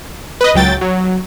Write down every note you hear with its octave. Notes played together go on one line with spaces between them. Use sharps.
B4 D#5
C#2 F#3 G5 A6
F#3